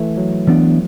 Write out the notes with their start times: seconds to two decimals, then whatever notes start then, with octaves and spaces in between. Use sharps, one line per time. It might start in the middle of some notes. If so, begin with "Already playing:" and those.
Already playing: E3 A3
0.17 F#3
0.47 E3 B3 D4